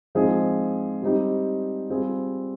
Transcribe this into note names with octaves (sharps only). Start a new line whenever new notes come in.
F3 G#3 C4 D#4 G#4
G3 C4 D#4 G4
G3 C4 F4 G#4